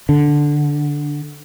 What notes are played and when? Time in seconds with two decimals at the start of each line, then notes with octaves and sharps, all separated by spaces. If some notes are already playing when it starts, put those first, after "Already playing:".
0.09 D3